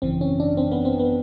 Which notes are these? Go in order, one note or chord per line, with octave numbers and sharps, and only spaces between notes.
G#1 F#2 C#3 E3 C4
C#4
D4
C4
B3
C4
B3